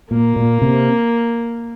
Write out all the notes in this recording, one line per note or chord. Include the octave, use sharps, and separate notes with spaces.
A#2 A#3
A#2
C3